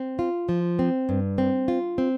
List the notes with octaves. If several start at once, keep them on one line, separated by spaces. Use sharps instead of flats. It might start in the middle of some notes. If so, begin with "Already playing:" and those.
Already playing: C4
F4
F3
C4
G2
C4
F4
C4